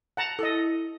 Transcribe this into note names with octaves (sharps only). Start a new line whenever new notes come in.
F#5 A5 A#5
E4 A4 D#5